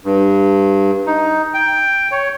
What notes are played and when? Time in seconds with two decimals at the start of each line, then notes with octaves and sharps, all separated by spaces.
0.05 G2
1.06 D#4
1.54 G5
2.12 C#5